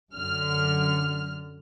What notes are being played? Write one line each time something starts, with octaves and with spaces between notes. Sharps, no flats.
F#2 D3 F6